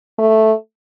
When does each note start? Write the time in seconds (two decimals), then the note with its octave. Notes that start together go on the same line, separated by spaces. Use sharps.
0.18 A3